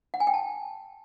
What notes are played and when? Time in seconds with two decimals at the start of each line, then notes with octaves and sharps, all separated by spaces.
0.14 F#5
0.20 G#5
0.27 G5
0.34 A5